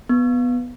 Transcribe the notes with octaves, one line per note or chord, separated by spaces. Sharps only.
B3